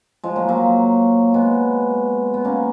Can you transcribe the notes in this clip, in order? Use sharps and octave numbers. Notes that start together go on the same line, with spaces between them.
F3 G#3
F#3 A#3
F#3 A#3
G#3 B3
B3
A#3 C#4